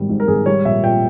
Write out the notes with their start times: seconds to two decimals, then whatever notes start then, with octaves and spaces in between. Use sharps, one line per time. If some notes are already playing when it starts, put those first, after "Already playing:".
Already playing: G#1 G3
0.09 G#2
0.20 A#4
0.28 G#1 G#4
0.46 G3 C#5
0.65 A#1 E5
0.83 A#2 G5